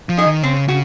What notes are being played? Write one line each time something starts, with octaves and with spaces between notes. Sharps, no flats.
F3
D#4 G#4 D#5
D#3
C#3 C4
C#3 F#4